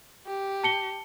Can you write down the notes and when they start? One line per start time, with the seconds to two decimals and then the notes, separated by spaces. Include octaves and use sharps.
0.27 G4
0.64 A5 C#7 G7